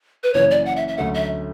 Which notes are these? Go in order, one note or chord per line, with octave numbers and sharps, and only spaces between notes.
B4
F#1 F#2 E3 C#5
D5
F#5
E5
E5
D2 D3 F#3 A3 C#4 F#5
E5